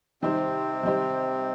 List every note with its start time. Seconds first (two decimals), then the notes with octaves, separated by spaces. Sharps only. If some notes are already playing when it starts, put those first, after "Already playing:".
0.22 C3 D#3 G3 C4 D#4 G4 C5
0.83 D#3 G3 D#4 G4 C5